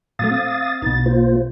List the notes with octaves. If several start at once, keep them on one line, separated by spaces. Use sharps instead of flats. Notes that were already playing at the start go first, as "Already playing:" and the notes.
A#2 F#3 A3 F5 D#6 A6
C4
B1 B2 D#4 A6
A#3 F4 C5